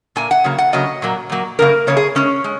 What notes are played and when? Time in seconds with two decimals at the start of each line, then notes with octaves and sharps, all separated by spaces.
0.16 A#2 A#3 G#5
0.31 F#5
0.44 C#3 F#3 A#3
0.58 F#5
0.73 C#3 F#3 A#3 D#5
1.02 A#2 F#3 A#3
1.30 A#2 F#3 A#3
1.59 F#2 C#3 A#3 A#4
1.87 F#2 C#3 A#3 C#5
1.97 G#4
2.15 C#3 G#3 C#4
2.44 G#3